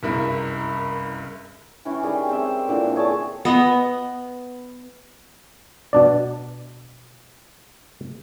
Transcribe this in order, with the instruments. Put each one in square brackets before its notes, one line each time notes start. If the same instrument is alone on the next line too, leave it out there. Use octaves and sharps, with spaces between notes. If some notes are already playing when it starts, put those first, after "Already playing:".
[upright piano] F#1 C2 G2 E4 A#4 E5
[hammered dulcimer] E3 C#4 E4 G4
D#3 G3 G#4
C4 A#4 E5
A#2 D3 E3
G#4 C#5 G5 A5
[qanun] B3 D#5
[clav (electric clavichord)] B2 D4 D5